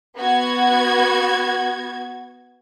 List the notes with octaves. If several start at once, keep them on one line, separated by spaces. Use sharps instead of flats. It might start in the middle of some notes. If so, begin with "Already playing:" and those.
B3 F#4 G#6